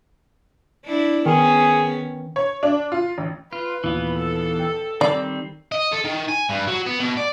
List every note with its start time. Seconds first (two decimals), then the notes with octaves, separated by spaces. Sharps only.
0.85 D4 E4
1.26 D#3 B3 C#4 G#4
2.36 C#5
2.63 D4
2.92 F4
3.18 A1
3.53 F4 B4
3.84 D#2 A#2 E3 B3 F5
4.19 A4
4.59 G5
5.01 D#3 G3 C4 D5 C7
5.72 D#5
5.92 A4
6.05 D#3
6.28 G#5
6.49 G2
6.67 F#3
6.86 B3
6.99 B2
7.17 D5